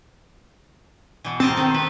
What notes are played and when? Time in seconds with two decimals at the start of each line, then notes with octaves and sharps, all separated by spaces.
1.25 B2 E3
1.40 C4 A#4 D#5 A5
1.56 D#3 A4
1.74 B4